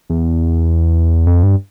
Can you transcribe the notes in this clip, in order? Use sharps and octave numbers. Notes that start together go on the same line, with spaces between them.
E2
F2
G2